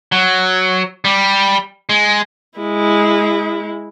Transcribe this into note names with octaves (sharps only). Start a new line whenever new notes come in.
F#3
G3
G#3
G#3 E4